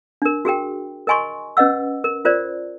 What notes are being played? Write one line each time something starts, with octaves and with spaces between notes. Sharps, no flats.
D4 A#4
F#4 G#4 A#4 G5
A#4 D#5 G#5 C6 C#6
C#4 B4 D#5 F#5 E6
A#4
F4 A#4 C5 D5